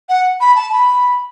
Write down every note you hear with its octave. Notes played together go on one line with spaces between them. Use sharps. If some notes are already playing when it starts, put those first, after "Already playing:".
F#5
B5
A5
B5